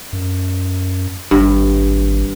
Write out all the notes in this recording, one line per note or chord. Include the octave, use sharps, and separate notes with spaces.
F#2
G#1 G2